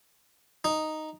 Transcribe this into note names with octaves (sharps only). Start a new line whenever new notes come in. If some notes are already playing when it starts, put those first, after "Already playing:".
D#4